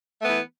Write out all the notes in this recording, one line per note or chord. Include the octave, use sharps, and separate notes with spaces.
E3 A3 B3